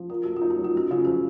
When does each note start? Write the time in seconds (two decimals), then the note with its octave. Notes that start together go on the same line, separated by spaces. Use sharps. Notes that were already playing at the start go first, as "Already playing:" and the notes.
Already playing: F3
0.10 F4 A#4
0.23 A3 F#4
0.37 F4
0.42 D#4
0.50 F#4
0.58 F#3
0.64 F4
0.75 F#2 F#4
0.91 C#3 F4
1.05 F3 F#4